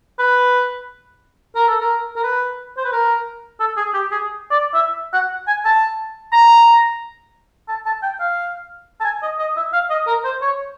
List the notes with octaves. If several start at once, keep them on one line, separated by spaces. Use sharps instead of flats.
B4
A#4
A4
A#4
A#4
B4
C5
B4
A#4
A4
G#4
G4
G#4
D5
E5
F#5
G#5
A5
A#5
A5
A5
G5
F5
A5
G#5
D#5
D#5
E5
F5
D#5
A#4
C5
C#5